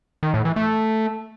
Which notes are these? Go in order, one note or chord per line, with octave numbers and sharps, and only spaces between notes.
D#3
A2
E3
A3